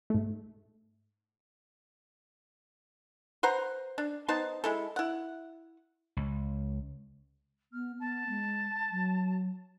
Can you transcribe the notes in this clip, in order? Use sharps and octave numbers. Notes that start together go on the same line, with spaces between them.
G#2 A3
B4 C5 F#5 A#5
D4
B3 D#4 C5 A5
G#3 E4 A4
E4 F#5
C#2
B3 F6
B3 A5
G#3
F#3